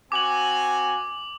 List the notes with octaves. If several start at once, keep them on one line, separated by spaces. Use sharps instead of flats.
C4 F#4 G#5 D6 F#7